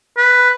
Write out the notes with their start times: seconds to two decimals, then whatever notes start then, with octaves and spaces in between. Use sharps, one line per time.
0.17 B4